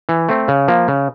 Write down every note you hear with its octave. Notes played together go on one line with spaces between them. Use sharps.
E3
A3 C4
C#3
F3 A#3
C#3